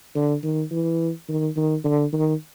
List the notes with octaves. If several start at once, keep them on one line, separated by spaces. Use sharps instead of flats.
D3
D#3
E3
D#3
D#3
D3
D#3